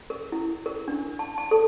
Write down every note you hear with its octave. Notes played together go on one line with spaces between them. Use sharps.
A#4
E4
A#4
D4
A5
A5
A4